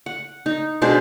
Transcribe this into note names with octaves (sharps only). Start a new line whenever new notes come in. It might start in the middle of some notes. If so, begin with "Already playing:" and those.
F#5
D#4
B2 G#3 D4 C5